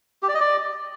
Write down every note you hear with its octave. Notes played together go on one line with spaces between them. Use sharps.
G4
D5
D#5
D5